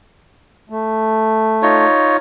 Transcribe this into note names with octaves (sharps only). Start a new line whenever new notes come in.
A3
D#4 F4 C#5